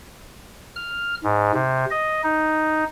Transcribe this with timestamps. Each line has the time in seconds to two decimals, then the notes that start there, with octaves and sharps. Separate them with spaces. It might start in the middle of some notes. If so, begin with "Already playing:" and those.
0.76 F6
1.24 G#2
1.54 C3
1.91 D#5
2.23 D#4